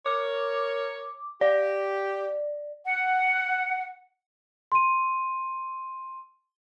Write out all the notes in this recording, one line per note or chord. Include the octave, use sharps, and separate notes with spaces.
A#4 C#5 D6
G4 D5
F#5
C6 D#7